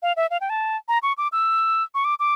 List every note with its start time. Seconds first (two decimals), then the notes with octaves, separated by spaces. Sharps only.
0.02 F5
0.16 E5
0.31 F5
0.41 G5
0.50 A5
0.88 A#5
1.03 C#6
1.18 D6
1.32 E6
1.95 C#6
2.05 D6
2.20 D6